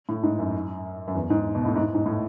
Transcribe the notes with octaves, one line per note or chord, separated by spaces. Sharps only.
A2
G#2
F#2
F#2
E2
G#2
B2
A2
G#2
G#2
A2